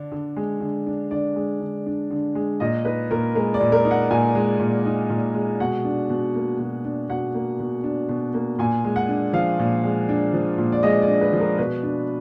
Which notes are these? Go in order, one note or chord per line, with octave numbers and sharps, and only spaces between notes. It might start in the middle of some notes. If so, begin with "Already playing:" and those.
Already playing: D3 D4
D3
G#3
D3
D4
D3 D5
G#3
D3
D4
D3
G#3
A#2 D#5
D#4 B4
A#2 A#4
G#3 A#4
D5
A#2
A#4
D#4
F#5
A#2 G#5
G#3
A#2
D#4
A#2
G#3
B2 F#5
D4
B2
A#3
B2
D4
B2 F#5
A#3
B2
D4
B2
A#3
A#2 G#5
G#3
F#5
D4
F3 F5
A#2
G#3
D4
F3
A#2
D5
G#3 D#5
D5
D4
B4
F3
A#4
B2 B4
D4